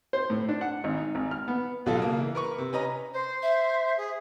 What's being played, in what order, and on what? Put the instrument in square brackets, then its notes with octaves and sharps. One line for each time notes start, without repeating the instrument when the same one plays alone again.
[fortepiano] C5
A2
D4
F#5
G#1
D#4
G#1
F6
B3
[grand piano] A1 B2 F#3 F4 A4
C#3 A#3
E3
A#4 B4 C#6
C3
C#4 B4 D#5 A#5
[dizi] C5
[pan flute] E5
[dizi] G#4